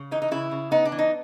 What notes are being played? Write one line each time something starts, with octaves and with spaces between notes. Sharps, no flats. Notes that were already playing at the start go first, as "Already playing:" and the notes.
Already playing: C#3
E3 D#4
D#4
C#3 E4
C#3
B3 D#4
D4
E3
D#4